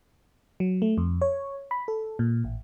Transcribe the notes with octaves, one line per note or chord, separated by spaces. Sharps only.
F#3
A3
F2
C#5
B5
A4
A#2
A1